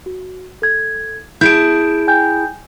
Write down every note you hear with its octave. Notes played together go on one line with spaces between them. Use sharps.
F#4
A4 G#6
E4 G#4 A5 G6 D7
G5 G#5 G6